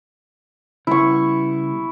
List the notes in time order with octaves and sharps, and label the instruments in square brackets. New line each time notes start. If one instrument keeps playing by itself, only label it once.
[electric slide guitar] C#3 G3 B3 [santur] E4 C#6